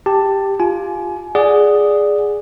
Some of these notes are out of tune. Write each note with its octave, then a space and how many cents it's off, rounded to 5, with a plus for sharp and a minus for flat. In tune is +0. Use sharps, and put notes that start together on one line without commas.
G4 +5 A5 +10
F4 +0 G#5 +30
G#4 +0 D5 +0 F#5 +0